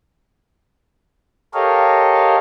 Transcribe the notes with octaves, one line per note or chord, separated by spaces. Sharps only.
G4 A4 A#4 C#5 D#5 F5